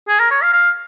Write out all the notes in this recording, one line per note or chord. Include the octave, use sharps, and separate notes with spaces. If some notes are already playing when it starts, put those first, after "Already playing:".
G#4
A#4
C#5
F5
F5